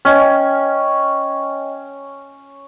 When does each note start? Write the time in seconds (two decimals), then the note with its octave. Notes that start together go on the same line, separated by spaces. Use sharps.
0.05 C#4 C#5 D#5 G5